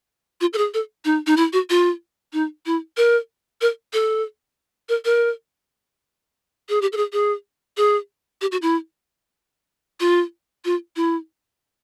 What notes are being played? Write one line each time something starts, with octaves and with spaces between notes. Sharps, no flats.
F4
A4
G#4
A4
D#4
D#4
E4
F#4
F4
D#4
E4
A#4
A#4
A4
A#4
A#4
G#4
G4
A4
G#4
G#4
G#4
G4
F#4
E4
F4
F4
E4